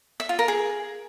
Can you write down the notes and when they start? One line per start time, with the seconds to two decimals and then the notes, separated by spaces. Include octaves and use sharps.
0.20 E5
0.29 F4
0.39 A#4
0.48 G#4